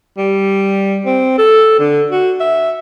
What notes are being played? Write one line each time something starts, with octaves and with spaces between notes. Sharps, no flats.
G3
C4
A4
D3
F#4
E5